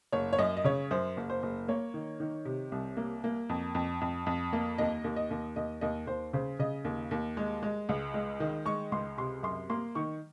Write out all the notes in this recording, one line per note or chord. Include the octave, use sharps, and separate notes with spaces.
F#1 C#5
C#5
F#2 D#5
D#5
C#3 C#5
F#2 C5
F#1
C5
F#1
A#3 C#5
D#3
D#3
C3
C2
A#3
A#3
F2
F2
F2
F2
A#3
D#2 D#5
D#2
D#5
D#2
D#2 D#5
D#2 D#5
D#2 C5
C#3 C5
C#3 D#5
D#2
D#2
G#3
G#3
C#2
G#3
D#3
G#3 C#6
C#2 C6
C3 C6
F#2 C6
A#3 C6
D#3 C#6